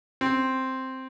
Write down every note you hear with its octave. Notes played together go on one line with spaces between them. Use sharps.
C4